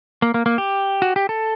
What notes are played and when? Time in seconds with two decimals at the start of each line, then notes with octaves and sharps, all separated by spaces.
0.22 A#3
0.34 A#3
0.46 A#3
0.58 G4
1.02 F#4
1.16 G4
1.29 A4